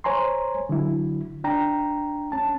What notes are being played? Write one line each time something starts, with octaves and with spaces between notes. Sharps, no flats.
C5 C#5 G#5 A#5 C6
D3 F#3 E4
D4 G5 A#5
C#4 A5